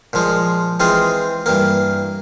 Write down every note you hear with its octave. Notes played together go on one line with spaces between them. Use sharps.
A#2 F3 G#3
E3 G#3 C4 F4 G#4
G2 E3 A#3